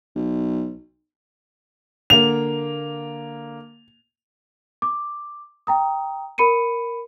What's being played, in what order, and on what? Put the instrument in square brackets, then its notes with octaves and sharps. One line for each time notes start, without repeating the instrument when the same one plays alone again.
[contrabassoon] B1
[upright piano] D3 A#3 [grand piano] F7
[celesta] D6
G5 A#5 D#6
A#4 B5 C#7 D#7